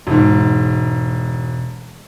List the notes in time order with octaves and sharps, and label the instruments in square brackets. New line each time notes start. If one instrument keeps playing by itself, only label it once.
[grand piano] E1 G#2